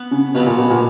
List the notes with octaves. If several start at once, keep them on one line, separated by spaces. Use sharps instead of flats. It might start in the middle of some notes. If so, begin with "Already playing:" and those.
Already playing: B3
C#3
B2 F#3 B3 F4
A#2
B2
A#2